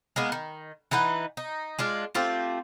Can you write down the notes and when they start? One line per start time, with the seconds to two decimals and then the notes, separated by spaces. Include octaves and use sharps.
0.16 G#3 A#3 B3
0.32 D#3
0.91 E3 D#4 B4 F#5
1.37 D#4
1.79 G#3 D4 F4
2.15 A3 C4 F4 G4